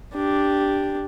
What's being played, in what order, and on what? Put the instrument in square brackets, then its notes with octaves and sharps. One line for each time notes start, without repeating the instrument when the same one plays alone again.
[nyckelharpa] D4 G4